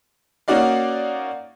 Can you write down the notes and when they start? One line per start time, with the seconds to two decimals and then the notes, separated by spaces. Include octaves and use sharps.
0.48 A#3 C#4 D#4 F#4 D5 F5